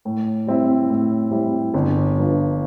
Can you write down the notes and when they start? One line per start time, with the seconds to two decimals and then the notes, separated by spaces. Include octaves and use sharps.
0.05 A2
0.47 G3 C4 E4
0.90 A2
1.31 G3 C4 E4
1.74 G1
2.16 G2 F3